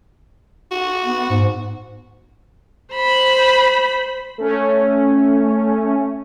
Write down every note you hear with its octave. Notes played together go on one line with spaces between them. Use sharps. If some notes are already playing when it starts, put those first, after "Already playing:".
F#4
B3
G#2
C5 B5
A3 C#4